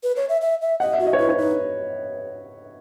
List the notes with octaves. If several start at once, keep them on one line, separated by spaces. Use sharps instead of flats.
B4
C#5
E5
E5
E5
D#5 F#5
E5
F#4
D#5
C#5
E4 B4
C#5
D#4 B4